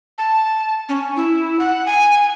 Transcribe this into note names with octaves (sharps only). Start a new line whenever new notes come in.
A5
C#4
E4
F#5
G#5